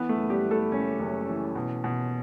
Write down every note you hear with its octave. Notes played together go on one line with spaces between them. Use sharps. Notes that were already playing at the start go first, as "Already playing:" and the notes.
Already playing: E3 B3 B4
A3 A4
F#1
G3 G4
E3
A3 A4
F#1 C#4 C#5
F#1
E3
B2
B2